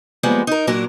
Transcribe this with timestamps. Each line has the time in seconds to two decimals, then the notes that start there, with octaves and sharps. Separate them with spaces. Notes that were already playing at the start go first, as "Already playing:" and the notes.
0.23 F3 G3 G#3 A#3 B3
0.47 D#4 A#4
0.67 A#2 F#3 A#3 D4 A#4